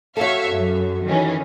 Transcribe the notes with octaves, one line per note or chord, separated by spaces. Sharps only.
F#4 A4 C#5 E5 F5
F#2
D#3 E3 C#4